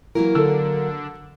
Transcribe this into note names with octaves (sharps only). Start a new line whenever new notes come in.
E3 F#3 A#3 A#4
D3 A4 E6